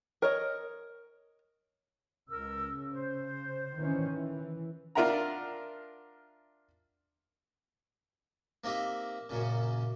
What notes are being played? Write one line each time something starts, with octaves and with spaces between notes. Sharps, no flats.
A#4 C#5 D#5
C#2 C#3 A#4 E6
C5
D#3 E3 C#4
E3
D4 F4 A#4 E5 F#5 A#5
A#3 C4 D#4 G4 E5
F#2 A#2 C#3